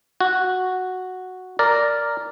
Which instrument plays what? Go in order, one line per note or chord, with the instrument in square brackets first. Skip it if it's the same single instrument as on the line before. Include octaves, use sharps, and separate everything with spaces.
[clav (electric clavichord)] F#4
A#4 D5